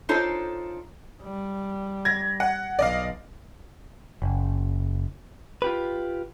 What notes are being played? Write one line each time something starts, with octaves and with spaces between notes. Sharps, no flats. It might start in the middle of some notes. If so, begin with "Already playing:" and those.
D4 D#4 F4 A4 C5 C#5
G3
G#6 A#6
F#5
B1 D5 D#5 F5
F#1
F4 G4 B4